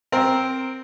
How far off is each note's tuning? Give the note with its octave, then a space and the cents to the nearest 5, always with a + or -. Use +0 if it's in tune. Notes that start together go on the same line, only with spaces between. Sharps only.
C4 +0 A#4 +0